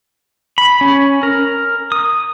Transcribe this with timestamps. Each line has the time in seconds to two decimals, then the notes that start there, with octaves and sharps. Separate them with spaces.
0.58 B5
0.81 C#4
1.23 A#4
1.92 D#6